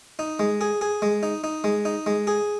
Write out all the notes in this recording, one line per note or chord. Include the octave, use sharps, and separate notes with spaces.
D#4
G#3
G#4
G#4
G#3
D#4
D#4
G#3
D#4
G#3
G#4